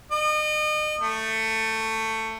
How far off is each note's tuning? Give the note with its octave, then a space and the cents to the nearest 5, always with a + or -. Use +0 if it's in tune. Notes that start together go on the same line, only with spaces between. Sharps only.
D#5 -35
A3 +15